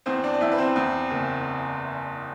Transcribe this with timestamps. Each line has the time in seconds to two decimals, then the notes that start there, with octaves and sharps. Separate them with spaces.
0.06 E2 C4 C5
0.23 D4 D5
0.34 D5
0.41 E2 E4 E5
0.51 B4
0.58 C4 C5
0.76 E2
1.10 F#1